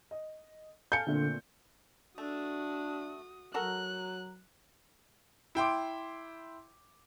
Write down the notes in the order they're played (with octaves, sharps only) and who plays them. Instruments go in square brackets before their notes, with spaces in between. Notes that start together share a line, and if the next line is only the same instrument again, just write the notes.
[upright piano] D#5
[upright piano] A4 G#5 A5 [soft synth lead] F5 [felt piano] G6 C#7
[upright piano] A#2 A3 C4 [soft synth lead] D3
[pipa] A3 [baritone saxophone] D4 [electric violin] F#4 D#6
[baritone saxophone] F#3 [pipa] F#4 A4 A#4 [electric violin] F#6
[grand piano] E4 G5 C6 D6